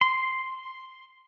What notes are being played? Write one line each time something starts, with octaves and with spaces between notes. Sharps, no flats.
C6